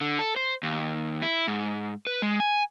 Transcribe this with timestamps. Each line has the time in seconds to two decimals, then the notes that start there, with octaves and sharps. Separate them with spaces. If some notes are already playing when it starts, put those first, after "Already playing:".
0.01 D3
0.19 A4
0.36 C5
0.63 D#2
1.22 E4
1.48 G#2
2.07 B4
2.22 G#3
2.40 G#5